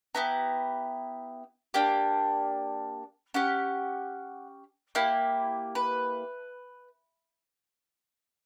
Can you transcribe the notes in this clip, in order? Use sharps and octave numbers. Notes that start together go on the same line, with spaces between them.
B3 E4 G4 A#5
A#3 D4 G4 G5
C#4 G4 F#5
A#3 E4 G4
B4